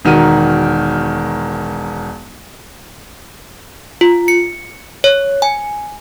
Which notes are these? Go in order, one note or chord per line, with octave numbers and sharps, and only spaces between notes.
E1 D#3 F#4 A#4 D#7
F4
C#7
C#5
G#5